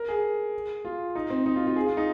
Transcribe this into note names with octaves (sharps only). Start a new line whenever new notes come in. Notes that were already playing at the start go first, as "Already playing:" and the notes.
Already playing: A#4
G#4
F4
D#4
C4
D#4
F4
F4
G#4
F4
D#4